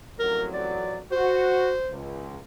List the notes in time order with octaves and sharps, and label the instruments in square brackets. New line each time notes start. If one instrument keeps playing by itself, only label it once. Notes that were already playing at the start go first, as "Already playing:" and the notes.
[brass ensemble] A1 F2 F#3 [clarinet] A#4
[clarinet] D5
[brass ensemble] F#4 [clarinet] C5
[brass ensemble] C#2